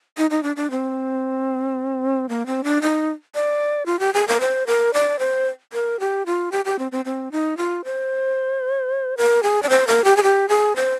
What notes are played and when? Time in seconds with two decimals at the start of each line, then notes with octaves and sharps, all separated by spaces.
0.17 D#4
0.30 D#4
0.43 D4
0.56 D4
0.71 C4
2.29 A#3
2.46 C4
2.64 D4
2.82 D#4
3.35 D5
3.86 F4
4.00 G4
4.14 G#4
4.28 A#4
4.40 C5
4.67 A#4
4.94 D5
5.19 C5
5.73 A#4
6.00 G4
6.26 F4
6.52 G4
6.65 G4
6.79 C4
6.92 C4
7.05 C4
7.32 D#4
7.57 F4
7.84 C5
9.17 A#4
9.43 G#4
9.63 D5
9.69 C5
9.87 A#4
10.04 G4
10.17 G#4
10.23 G4
10.49 G#4
10.76 C5